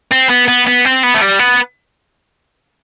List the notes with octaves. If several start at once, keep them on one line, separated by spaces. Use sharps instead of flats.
C4
B3
B3
B3
C4
B3
A3
G3
B3